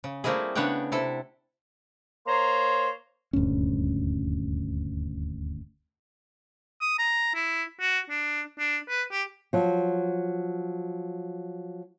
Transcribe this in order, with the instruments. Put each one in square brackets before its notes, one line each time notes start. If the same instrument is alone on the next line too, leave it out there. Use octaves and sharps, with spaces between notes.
[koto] C#3
G3 A3 A#3 C4 E4 G#4
C#3 B3 D4 C#5 F#5 G5
C3 E4 A4
[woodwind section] A#3 C5 C#5 A#5 C6
[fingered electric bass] D#1 D2 G2 C#4
[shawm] D#6
A#5
E4
F#4
D4
D4
B4
G4
[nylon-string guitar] F3 F#3